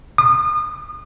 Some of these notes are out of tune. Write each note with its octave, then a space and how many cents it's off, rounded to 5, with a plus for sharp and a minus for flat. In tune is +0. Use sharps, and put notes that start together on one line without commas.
D#6 -35